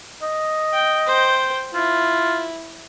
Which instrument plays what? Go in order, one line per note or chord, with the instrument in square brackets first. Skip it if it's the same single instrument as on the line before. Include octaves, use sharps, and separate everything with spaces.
[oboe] D#5
[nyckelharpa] G5
C5 G5
[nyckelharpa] E4 [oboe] F4